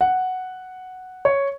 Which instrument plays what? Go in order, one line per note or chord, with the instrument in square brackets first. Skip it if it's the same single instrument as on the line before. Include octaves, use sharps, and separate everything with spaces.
[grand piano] F#5
C#5